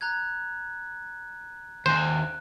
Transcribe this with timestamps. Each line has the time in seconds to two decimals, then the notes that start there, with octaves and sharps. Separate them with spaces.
0.01 A#5 F#6 G#6
1.86 D#2 C5 G#5 F#6